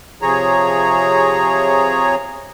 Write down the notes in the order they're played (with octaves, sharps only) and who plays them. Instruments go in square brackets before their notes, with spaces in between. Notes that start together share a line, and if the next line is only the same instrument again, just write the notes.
[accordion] C3 F3 G#4 C#5 A#5